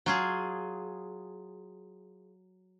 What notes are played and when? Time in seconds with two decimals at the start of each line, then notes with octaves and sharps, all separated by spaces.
0.06 F#3 F4 G#4